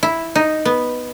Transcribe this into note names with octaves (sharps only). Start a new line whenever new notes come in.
E4
D#4
B3